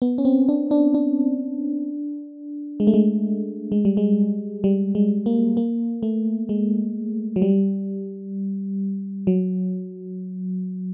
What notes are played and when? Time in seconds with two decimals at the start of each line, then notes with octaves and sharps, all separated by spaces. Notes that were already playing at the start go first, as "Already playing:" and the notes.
0.02 B3
0.18 C#4
0.25 C4
0.49 D4
0.71 D4
0.94 D4
2.80 G#3
2.87 A3
2.94 G#3
3.72 G#3
3.85 G3
3.97 G#3
4.64 G3
4.95 G#3
5.26 A#3
5.57 A#3
6.03 A3
6.49 G#3
7.36 F#3
7.42 G3
9.27 F#3